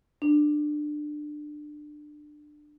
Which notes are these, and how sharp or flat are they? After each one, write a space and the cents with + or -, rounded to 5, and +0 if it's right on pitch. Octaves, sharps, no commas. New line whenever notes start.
D4 +20